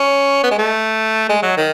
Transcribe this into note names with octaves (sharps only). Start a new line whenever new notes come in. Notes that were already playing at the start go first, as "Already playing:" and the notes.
Already playing: C#4
B3
G#3
A3
G#3
F#3
D#3